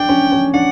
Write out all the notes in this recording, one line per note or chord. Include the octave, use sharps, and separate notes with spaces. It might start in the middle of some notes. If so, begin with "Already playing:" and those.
Already playing: D4 G5
C#4
C#4
D4 F#5